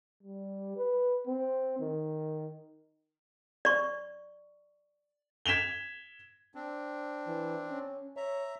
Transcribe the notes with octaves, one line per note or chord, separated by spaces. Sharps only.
G3
B4
C4
D#3
D5 C#6
G#6 B6 E7 F7 G7
C4 D4
E3
C#4
C#5 E5 A#5